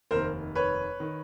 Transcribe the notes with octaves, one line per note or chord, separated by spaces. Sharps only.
F1 D#2 D#3 A#4 C5
B4 C#5
D#3